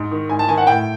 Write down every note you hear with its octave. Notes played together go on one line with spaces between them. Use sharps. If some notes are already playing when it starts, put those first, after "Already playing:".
Already playing: G#2
D#3
G#2 G#5
A5
D#3 G#5
F#5
A2 G5